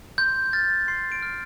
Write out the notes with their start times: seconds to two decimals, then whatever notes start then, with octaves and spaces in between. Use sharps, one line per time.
0.18 C6 G6
0.53 F6 A6
0.88 C6 C7
1.12 D7
1.22 F6